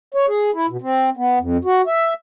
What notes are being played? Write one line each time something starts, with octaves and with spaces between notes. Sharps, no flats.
C#5
G#4
E4
B2
C4
B3
F2
F#4
E5